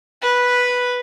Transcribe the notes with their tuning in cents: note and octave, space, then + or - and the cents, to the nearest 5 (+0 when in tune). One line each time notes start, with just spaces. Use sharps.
B4 -5